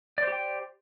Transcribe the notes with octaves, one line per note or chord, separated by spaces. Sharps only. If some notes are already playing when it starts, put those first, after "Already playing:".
G4 C5 D5 G5